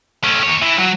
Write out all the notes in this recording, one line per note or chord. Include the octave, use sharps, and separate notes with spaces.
A3 C#4
D#2 C#5
E3
F#3